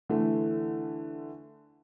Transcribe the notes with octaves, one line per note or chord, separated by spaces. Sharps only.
D3 E3 A3